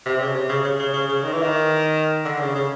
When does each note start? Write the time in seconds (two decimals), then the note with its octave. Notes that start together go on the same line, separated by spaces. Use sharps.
0.06 C3
0.21 C#3
0.35 C3
0.49 C#3
0.64 C#3
0.79 C#3
0.93 C#3
1.08 C#3
1.23 D#3
1.33 E3
1.42 D#3
2.25 D3
2.40 C#3
2.55 C#3